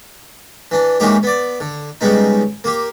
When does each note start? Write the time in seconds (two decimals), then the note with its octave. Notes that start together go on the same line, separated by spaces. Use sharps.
0.71 E3 D4
1.00 E3 G#3 A#3 C#4 D#4 G4
1.23 B3 D5
1.60 D3
2.01 C#3 G3 G#3 B3 D#4
2.64 A#3 G4